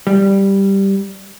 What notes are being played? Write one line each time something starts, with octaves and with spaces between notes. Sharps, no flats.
G3